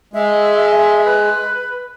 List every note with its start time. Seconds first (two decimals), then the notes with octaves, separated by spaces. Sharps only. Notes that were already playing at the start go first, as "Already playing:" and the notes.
0.14 G#3 E5
1.05 B4